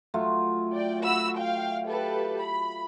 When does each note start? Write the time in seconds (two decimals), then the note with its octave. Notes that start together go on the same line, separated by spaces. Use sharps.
0.14 F#3 A3 F4
0.72 D5 G5
1.02 F#4 B5 E6
1.37 F5 G5
1.86 G4 A4 B4
2.41 B5